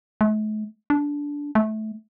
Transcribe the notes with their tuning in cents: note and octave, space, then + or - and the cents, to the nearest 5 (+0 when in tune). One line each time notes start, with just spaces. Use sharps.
A3 -45
D4 -15
A3 -20